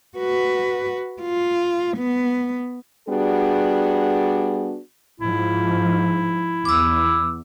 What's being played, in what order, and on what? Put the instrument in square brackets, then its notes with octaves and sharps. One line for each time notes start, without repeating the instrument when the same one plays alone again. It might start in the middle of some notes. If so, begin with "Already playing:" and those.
[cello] F#4 B4
F4
B3
[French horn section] G3 B3 D4 F#4 G#4
[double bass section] G#2 F3 [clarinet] E4
[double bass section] E2 [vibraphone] D6 E6